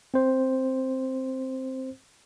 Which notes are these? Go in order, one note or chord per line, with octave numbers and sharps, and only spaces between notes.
C4 C5